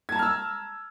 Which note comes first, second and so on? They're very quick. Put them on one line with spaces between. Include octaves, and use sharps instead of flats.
G#6 A5 A#5 F6 E6